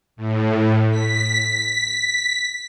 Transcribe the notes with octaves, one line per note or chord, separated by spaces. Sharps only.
A2
B6